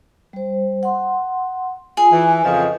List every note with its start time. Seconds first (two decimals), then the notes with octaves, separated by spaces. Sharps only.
0.33 G3 C5
0.83 F#5 C6
1.97 F4 G#4 G#5
2.12 E3
2.44 F2 C#3 F3 B4 D#5